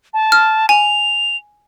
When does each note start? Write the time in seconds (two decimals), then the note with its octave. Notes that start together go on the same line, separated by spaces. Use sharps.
0.14 A5
0.32 F6
0.69 G#5 F7